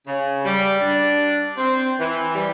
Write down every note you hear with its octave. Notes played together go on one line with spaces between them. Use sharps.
C#3
G3
D4
C4
E3
G3